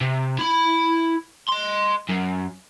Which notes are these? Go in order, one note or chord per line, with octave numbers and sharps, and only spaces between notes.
C3
E4 B5
D#5 C6
F#2